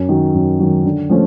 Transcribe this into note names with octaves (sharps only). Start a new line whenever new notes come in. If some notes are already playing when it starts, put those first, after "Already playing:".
Already playing: F#2
D#3 F#3
F#2
D#3 F#3
D3
F3 A3 C#4